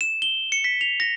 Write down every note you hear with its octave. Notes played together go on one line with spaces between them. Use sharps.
E7
G7
C#7
B6
F7
A#6